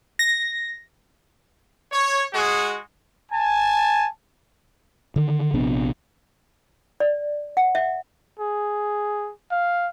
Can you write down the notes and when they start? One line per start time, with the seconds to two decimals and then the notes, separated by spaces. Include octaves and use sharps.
0.19 A#6
1.92 C#5
2.33 G#3 F#4 G#4
3.32 G#5 A5
5.16 D3 D#3
5.54 A#1 C3 B3 D4
7.00 D5
7.57 F#5
7.75 E5
8.39 G#4
9.51 F5